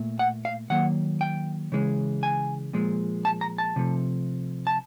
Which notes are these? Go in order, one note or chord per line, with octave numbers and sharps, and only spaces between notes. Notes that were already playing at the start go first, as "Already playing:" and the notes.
Already playing: A#2 A3
F#5
F5
D#3 F#3 A#3 F#5
G5
C#3 E3 G#3
G#5
A#2 F3 G#3
A5
A#5
A5
C3 F3 A3
A5